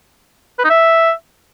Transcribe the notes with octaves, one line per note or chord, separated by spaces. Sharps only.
B4
D#4
E5